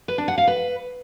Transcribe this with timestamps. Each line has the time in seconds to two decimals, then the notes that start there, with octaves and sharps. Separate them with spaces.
0.08 B4
0.18 D4
0.28 F#5
0.38 F5
0.47 B4